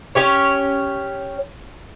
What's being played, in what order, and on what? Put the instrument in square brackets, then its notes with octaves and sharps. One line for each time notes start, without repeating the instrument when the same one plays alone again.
[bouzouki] C#4 G4 C#5